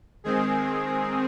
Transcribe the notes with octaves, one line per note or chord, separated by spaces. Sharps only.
D#3 G#3 C4 G#4